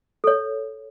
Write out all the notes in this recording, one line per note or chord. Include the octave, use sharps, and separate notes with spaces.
A4 C#5